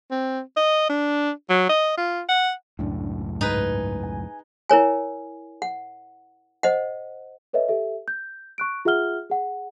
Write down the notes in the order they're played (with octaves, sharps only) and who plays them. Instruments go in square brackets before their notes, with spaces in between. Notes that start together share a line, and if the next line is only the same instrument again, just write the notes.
[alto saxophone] C4
D#5
D4
F#3
D#5
F4
F#5
[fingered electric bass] C#2 F#2 A2 [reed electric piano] D4
[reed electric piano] G#2 [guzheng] D#4 G#4 B4
[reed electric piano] G#5
[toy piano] E4 A#4 C#5 G#5
F#5
C5 D#5 F#5
[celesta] A4 B4 C#5 D#5 E5
G4 A4 E5
G6
C#6 F#6 D7
F4 G#4 E5 F#5 F6 G7
G#4 F#5